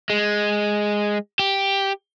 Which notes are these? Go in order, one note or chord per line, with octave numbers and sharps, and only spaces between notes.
G#3
G4